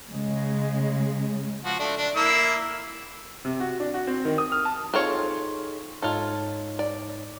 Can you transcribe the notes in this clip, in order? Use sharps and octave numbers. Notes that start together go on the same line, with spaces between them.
C#3 G#3
F3 F#4
A3 D4
D4
A#3 E4 E6
C3
F#4
D4
F#4
C4
D#3
D#6
F6
A5
C4 D#4 F4 G#4 A4 C#5
G#2 D#4 F4 A4 C#5
D5